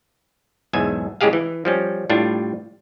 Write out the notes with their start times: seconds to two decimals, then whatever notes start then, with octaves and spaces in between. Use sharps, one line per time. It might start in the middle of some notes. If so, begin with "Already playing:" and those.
0.73 B1 E2 G#2 E5 G#5
1.21 A2 C#3 G#3 G4 G#4 F5
1.33 E3
1.65 F3 G3 C#4
2.10 A2 G3 D4 F4